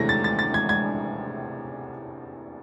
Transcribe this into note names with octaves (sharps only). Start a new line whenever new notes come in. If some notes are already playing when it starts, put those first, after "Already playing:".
Already playing: E2 C3 E3 A3 G#6 A#6
A6
A6
A6
G#6
G#6